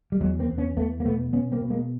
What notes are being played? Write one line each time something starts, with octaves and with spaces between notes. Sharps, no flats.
G3
E2 F#3 G#3
A#3 C4
E2
B3 C#4
E2 A3 B3
A#3
B2 A3 B3
B2 B3 C#4
A#3 C4
B2
G#3 A#3